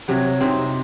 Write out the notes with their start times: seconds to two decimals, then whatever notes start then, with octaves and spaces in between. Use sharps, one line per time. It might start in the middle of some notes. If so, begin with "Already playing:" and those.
0.08 C3 F#3
0.40 C3 C4 D#4